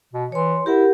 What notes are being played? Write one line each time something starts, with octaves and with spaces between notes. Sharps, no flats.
B2
E3 C#5 C6
E4 G4 A#4 F#5